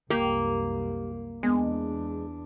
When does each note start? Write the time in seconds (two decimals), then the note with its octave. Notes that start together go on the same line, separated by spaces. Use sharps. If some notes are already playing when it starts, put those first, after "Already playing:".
0.10 C2 F#2 A#3 G4
1.43 E2 G#3 B3 D4